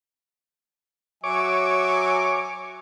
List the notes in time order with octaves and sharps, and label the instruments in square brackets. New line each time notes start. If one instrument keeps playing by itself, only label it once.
[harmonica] F#3 E5 G#5 [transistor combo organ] C#5 D6